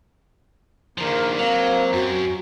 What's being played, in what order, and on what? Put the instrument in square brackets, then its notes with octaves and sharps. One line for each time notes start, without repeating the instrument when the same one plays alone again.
[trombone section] A#1 A#4 [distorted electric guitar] D#3 F3 [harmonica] A#3
[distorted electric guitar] F#3 [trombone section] C4 [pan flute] F5
[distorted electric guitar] F#2 [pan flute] F#4